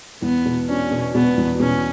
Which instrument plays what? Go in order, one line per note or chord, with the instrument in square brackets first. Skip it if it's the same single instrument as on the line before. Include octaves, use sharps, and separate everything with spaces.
[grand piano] E2 [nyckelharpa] B3
[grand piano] B2
[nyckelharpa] C#4 [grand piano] D4
[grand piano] B2
[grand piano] B2 [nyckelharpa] B3
[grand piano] E2
[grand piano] B2 [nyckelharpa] C#4